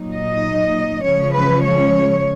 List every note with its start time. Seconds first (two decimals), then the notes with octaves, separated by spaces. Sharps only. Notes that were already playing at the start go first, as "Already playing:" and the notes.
Already playing: A#2 F#3 A#3 D#4
0.14 D#5
1.04 C#3 F3 G#3 C#4 C#5
1.33 B4
1.63 C#5